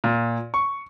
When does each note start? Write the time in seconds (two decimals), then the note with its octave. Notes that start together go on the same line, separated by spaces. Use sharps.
0.04 A#2
0.54 C#6